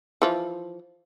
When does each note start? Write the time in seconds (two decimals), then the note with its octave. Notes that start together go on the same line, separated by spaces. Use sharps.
0.22 E3 F3